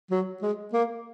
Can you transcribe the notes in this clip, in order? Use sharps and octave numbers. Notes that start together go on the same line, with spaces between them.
F#3
G#3
A#3